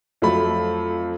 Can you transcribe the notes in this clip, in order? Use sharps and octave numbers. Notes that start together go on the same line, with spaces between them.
F2 F#3 A3 B5